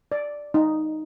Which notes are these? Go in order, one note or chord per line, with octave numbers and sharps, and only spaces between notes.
D5
D#4